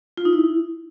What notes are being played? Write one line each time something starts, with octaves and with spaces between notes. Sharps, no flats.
F4
D#4
E4